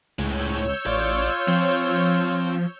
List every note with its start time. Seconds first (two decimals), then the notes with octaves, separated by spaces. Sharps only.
0.19 C#2 A2 G#3 C#5 E6 G6
0.87 A1 F4 D5
1.48 F3 C4